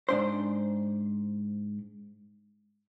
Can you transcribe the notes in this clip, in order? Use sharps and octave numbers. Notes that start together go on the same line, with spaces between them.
G#2 D4 C5